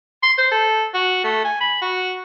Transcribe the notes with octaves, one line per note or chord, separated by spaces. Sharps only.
C6
C5
A4
F#4
A3
G#5
B5
F#4